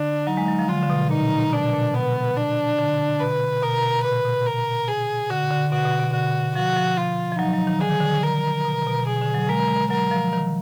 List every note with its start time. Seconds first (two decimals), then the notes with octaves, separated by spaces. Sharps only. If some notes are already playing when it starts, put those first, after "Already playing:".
Already playing: D3 D4
0.27 F#3 D#4
0.37 G#3
0.48 F#3
0.59 F3
0.69 D3 F4
0.83 D3
0.90 B2
1.11 A#2 D#4
1.53 B2 D4
1.67 B2
1.73 A#2
1.94 B2 B3
2.37 D4
2.78 D3
3.20 B2 B4
3.62 B2 A#4
4.04 A#2 B4
4.25 B2
4.46 A#4
4.88 G#4
5.30 D3 F#4
5.51 D3
5.72 B2 F#4
5.85 B2
5.99 B2
6.13 D3 F#4
6.55 F3 F#4
6.76 F3
6.97 F4
7.32 F3
7.39 F#3 D#4
7.53 F#3
7.67 D#3
7.81 D3 G#4
7.90 D#3
8.01 D3
8.23 A#4
8.65 B2
8.87 B2
9.07 B2 G#4
9.21 D3
9.35 F#3
9.49 G#3 A#4
9.70 G#3
9.90 F#3 A#4
10.11 F3
10.33 D#3